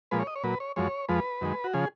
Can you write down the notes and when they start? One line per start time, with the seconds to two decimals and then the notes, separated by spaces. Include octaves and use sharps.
0.11 A#2 F3 G#3 B4
0.20 C#5
0.27 D#5
0.36 C#5
0.44 A#2 F#3 B4
0.60 C#5
0.76 F#2 F3 G#3 C#5
1.08 F2 F3 G#3 B4
1.41 F#2 D#3 G#3
1.64 F#4
1.74 C#3 F3 G#4